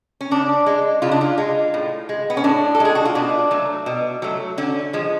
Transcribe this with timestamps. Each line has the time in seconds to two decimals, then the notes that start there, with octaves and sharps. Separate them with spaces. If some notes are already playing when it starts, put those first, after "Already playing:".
0.21 C#4
0.31 C#3 D4
0.66 G#3
1.02 C#3 F4
1.12 D4
1.21 F4
1.38 G#3
1.74 A2
2.09 G#3
2.30 B3
2.37 C#4
2.44 A2 D4
2.75 A4
2.80 G#3 G#4
2.95 F#4
3.05 F4
3.15 B2 D4
3.51 F#3 A3
3.86 B2
4.22 F#3 A3
4.58 D3 C#4
4.93 F3 G#3